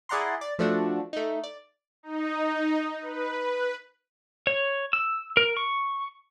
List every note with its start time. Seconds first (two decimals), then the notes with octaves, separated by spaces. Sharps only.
0.09 E4 G#4 D5 F#5 A#5 C6
0.41 D5
0.59 F3 A3 D4 F#4
1.13 A3 D#4
1.44 D5
2.03 D#4
3.01 B4
4.47 C#5
4.93 E6
5.37 A#4
5.57 C#6